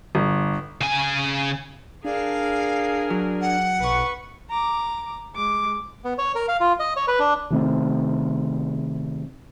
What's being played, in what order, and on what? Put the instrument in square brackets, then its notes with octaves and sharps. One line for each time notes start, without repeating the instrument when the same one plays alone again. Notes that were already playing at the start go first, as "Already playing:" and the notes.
[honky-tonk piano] G1
[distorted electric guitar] C#3 G#5
[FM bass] D4 [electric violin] G#4 A#4 [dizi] F5
[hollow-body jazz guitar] F#3
[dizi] F#5
[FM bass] B1 [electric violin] B4 C#6
[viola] A#5 D6
G#3 D6
[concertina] B3
C#5
A#4
F5
F4
D#5
C#5
B4
D4
[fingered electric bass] C3 D#3 A3 C4